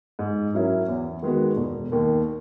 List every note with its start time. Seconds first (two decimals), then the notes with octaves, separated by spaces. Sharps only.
0.19 G#2
0.54 F#3 C#4 E4 A#4
0.88 E2
1.23 D#3 G#3 B3 F#4
1.56 E1
1.92 D#2 D#3